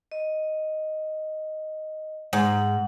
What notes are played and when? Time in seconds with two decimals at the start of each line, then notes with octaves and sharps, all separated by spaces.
0.12 D#5
2.33 G#2 F#5